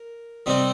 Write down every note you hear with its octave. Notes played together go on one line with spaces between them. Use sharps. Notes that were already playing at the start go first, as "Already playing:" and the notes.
Already playing: A#4
C3 G3 C4 D#4